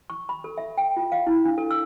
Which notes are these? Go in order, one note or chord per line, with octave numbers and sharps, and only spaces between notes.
C#6
B5
A4
E5
G5
F4
F5
E4
D4
A4
E6